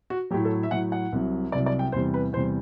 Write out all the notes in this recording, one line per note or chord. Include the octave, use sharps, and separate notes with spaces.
F#4
A2 F#3 G4
A4
E5
A2 F#3 F#5
F#5
C2 C3 F#3
C2 C3 F#3 D5
D5
G5
E2 C3 G3 C5
B4
E2 C3 G3 C5